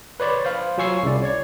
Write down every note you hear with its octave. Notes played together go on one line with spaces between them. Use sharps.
B4 C#5 D5 B5 C6
C5 F5 B5
F#3 F4 G#5 C#6 E6 C7
C2 C#3 E4 D5
C#5 D5 G#6